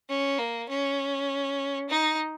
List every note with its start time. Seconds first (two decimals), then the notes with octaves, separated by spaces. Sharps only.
0.09 C#4
0.39 A#3
0.69 C#4
1.89 D#4